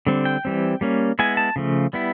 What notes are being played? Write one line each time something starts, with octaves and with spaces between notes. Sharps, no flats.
D3 G3 C4
G5
E3 G3 C4
G3 A#3 C#4
G#3 B3 E4 G#5
A5
C#3 F3 A3
G3 B3 E4